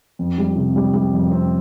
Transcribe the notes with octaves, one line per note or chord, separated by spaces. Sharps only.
F2
G3
C3
G3
G3
F2
C4